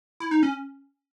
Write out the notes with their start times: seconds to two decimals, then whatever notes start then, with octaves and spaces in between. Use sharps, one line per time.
0.20 E4
0.31 D#4
0.43 C#4